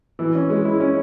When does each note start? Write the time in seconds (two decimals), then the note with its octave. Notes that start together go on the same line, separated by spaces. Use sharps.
0.19 E3
0.35 C#4
0.50 G#3
0.65 E4
0.80 C#4